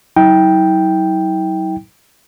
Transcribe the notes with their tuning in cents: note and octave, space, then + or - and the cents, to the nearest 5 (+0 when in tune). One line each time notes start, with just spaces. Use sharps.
F#3 +35 E4 -45 G5 +0